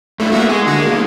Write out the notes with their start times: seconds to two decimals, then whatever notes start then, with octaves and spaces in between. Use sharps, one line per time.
0.20 G2 A3 D4 E4
0.32 A#3 B3 F#4 E5
0.49 G#3 G#4
0.67 D3 F#4
0.79 A#3
0.91 B2 D#3 F#3